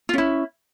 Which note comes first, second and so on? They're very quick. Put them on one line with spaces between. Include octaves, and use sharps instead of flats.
F4 C#4 E4